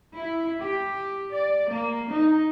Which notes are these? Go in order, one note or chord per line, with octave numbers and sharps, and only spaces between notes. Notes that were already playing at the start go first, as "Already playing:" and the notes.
E4
G4
D5
A#3
D#4